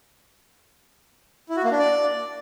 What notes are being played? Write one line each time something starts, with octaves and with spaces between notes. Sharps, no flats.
E4
F#4
A#3
D4
D5